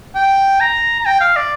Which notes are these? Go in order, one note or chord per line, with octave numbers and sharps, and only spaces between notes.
G5
A#5
A#5
G5
F5
D5